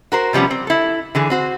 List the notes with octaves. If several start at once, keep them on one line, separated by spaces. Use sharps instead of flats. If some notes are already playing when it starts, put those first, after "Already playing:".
F#4 A#4 C5
C3 F3 G3 B3 C#4
C4
E4 A4
D3 E3 G#4
C4 F#4 C5